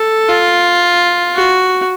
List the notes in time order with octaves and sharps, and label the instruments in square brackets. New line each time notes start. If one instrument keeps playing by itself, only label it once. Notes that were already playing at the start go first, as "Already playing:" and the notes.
Already playing: [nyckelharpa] A4
F4
F#4